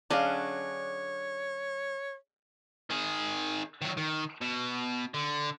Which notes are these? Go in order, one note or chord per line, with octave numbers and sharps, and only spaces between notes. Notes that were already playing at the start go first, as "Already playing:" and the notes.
D3 F#3 C#4 D4 G#4 C#5 D#5 F5
D#3 G#4
D#3 F#3
D#3
B2
D3